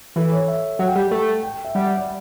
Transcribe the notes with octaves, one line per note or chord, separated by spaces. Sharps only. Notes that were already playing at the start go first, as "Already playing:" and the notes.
E3 A4
C#5
E5
F#3 F#5
G5
G3 F#5
A3 A5
G5
E5
G3 F#5
D5